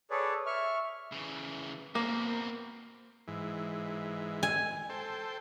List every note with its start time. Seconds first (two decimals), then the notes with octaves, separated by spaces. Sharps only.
0.11 G#4 A4 B4 C#5 D5
0.46 E5 C#6 F6
1.12 C#3 E3
1.95 B2 A#3 C4
3.28 G#2 E3
4.43 G#5
4.90 A4 C5 G5